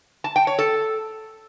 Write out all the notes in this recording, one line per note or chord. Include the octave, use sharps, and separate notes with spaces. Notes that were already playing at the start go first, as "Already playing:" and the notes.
A5
G5
C#5
A4